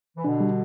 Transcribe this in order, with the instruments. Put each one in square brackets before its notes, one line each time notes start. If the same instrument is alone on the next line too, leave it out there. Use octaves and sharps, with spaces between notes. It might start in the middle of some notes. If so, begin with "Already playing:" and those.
[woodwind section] E3
[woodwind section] B2 D3 [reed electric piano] D4
[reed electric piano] G3